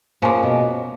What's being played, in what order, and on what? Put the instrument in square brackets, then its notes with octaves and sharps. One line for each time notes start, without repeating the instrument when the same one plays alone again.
[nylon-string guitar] A#2 [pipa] C#3 F3 A#3
[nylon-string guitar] B2